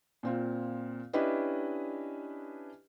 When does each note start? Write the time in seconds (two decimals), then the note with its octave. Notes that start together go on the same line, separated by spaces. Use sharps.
0.23 A#2 C4 F4
1.13 C#4 D4 E4 G4 B4 D#5